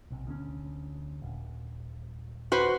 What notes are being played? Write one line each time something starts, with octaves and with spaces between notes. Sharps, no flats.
B1 C3
D2 B3 C#4
D#1
F#4 B4 C5